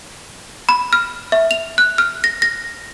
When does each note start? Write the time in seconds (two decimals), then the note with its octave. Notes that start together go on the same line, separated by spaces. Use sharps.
0.69 B5
0.93 F6
1.32 E5
1.51 F7
1.78 F#6
1.98 F6
2.24 A#6
2.42 A#6